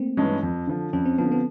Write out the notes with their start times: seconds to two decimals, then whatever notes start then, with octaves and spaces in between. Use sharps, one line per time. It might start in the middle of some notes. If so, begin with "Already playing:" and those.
Already playing: A3 A#3 C4
0.17 G2 E3 G#3 C#4
0.43 F2
0.67 D3 F3
0.93 F2 C#4
1.05 C4
1.18 D3 F3 B3
1.32 B3